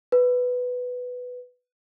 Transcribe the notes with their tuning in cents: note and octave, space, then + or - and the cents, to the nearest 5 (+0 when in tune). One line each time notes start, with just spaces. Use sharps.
B4 +5